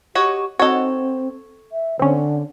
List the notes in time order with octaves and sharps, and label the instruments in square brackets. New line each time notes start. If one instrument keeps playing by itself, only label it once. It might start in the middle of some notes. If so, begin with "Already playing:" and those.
[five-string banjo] F#4 C#5 D#5 [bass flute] G4
[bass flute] C4 [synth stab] D#4 F#4 [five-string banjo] A4 C#5
[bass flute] E5
[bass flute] D3 [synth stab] C4 C#4